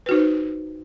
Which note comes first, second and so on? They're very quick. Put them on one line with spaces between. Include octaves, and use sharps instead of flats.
B4 F#4 D#4 C5